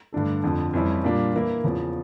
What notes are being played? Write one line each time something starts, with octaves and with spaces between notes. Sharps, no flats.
G2 D3 A3 D4 A4
F2 D3 F3
F2 E3 G3 C#4 E4
A#2 G3 A#3 D4 F4
E3 A#3 E4
E2 C#3 F3